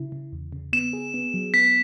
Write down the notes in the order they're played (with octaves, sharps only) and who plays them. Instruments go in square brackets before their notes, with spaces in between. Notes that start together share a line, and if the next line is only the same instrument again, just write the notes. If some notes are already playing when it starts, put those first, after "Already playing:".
Already playing: [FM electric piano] C#3 E4
C#3
E2
C#3
[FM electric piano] B3 [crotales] E7
[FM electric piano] G#4
B3
F#3
[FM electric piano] B3 [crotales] B6